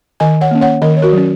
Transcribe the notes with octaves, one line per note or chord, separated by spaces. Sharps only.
D#3 D#5 G#5
C#5 F#5
A#3 C#4
C#5 F#5
D#3 A#4 D#5
C#5
F#4 A#4
F#3 C#4